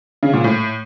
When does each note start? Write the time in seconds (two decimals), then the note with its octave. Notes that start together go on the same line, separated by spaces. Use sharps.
0.23 C#3
0.33 A#2
0.44 A2